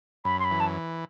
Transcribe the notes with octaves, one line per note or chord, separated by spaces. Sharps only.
F#2 B5
C6
B5
E3
A5